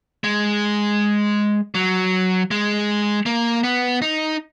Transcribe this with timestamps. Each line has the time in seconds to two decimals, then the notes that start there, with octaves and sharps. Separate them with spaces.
0.24 G#3
1.75 F#3
2.51 G#3
3.26 A#3
3.64 B3
4.02 D#4